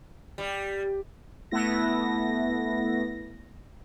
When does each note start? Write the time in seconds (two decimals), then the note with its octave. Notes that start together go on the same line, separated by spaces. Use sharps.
0.38 G3
1.51 A3 B3 E4 A#6